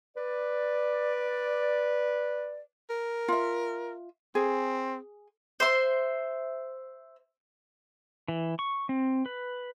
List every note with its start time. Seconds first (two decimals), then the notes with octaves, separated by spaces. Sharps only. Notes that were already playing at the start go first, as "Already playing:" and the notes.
0.17 B4 D5
2.90 A#4
3.28 F4 E5
4.35 C4 G#4
5.60 C5 E5 C6
8.28 E3
8.59 C#6
8.89 C4
9.26 B4